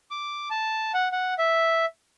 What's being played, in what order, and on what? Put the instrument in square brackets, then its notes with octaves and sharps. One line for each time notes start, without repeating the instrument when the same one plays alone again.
[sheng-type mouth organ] D6
A5
F#5
F#5
E5